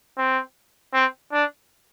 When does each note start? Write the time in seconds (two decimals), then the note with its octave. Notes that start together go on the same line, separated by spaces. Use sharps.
0.18 C4
0.94 C4
1.32 D4